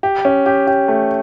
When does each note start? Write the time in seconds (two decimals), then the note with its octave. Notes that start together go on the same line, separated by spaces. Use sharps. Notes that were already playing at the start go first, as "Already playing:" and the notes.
0.03 G4
0.25 C#4
0.46 G4
0.67 G4
0.88 A3